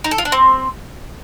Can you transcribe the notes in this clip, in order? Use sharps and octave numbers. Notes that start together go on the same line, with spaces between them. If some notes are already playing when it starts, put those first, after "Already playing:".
D#4
A4
F4
D4
C4